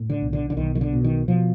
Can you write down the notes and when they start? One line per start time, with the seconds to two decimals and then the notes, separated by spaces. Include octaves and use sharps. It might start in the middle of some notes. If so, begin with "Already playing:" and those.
Already playing: A2
0.10 D3
0.21 B1
0.33 D3
0.50 D3
0.57 B1 D#3
0.75 D#3
0.81 D3
0.93 B2
1.04 D#3
1.28 B2 F3